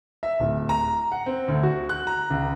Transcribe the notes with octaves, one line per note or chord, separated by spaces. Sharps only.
E5
D1
A#5
F#5
C4
D2
F#4
F#6
A#5
C#2